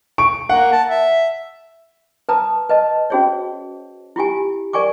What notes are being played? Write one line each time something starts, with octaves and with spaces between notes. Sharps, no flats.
C#6 D7
A#3 F#5
A5
E5
B4 A5 A#5 D#6
B4 D#5 A5
C#4 F#4 G#4 C5 C#5
E4 F4 G4 G#5
A#4 D5 G#5 C#6 D6